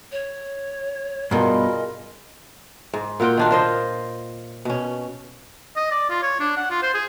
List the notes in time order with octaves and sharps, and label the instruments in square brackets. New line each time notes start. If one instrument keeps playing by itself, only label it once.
[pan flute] C#5
[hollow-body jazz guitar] G2 B2 [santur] F4 G#4 A#4 [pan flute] D#5
[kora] G#2
A#2 F4 F#4 G5
D#3 D4 F4
F4 C5 D#5
B2 C#4
[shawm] D#5
D5
F4
C#5
D4
F#5
F4
C5
G#4